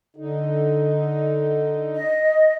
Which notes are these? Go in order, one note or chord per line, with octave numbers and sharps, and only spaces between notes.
D3 D#4
D#5